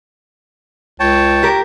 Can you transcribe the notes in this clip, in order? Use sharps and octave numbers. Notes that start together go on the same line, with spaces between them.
C#2 C#5 G5 A5
G4 A#4